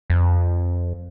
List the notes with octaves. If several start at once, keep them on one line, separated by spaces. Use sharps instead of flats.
F2